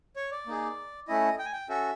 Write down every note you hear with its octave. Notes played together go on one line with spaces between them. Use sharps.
C#5
D5
A#3 D#4 G#4
A3 C#4 E4 D#5
G5
G#5
G5
C#4 F#4 A4 E5